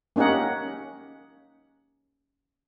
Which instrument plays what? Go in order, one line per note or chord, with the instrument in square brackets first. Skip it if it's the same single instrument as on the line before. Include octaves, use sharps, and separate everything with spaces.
[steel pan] A#3 C#4 D#4 G4 F#5